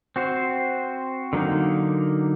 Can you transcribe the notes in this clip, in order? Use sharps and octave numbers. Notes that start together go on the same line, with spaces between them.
C4 F#4 C5
D3 F#3 A#3 D#4